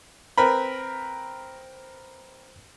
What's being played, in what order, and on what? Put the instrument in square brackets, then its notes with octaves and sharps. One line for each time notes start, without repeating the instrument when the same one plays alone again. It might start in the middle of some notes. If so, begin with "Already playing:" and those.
[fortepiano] C4 A#4 B4 B5